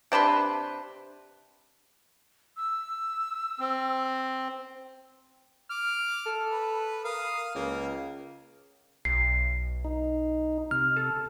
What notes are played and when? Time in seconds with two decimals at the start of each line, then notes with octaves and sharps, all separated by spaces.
0.12 C3 D4 B4 C6
2.57 E6
3.59 C4
5.70 D6 F6
6.26 A4
6.50 B4
7.04 A#4 F5 D#6
7.55 C#2 A#3
9.05 B1 C7
9.85 D#4
10.71 C3 F6
10.96 A4